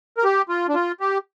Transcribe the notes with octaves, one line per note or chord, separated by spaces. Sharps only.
A#4
G4
F4
D4
F4
G4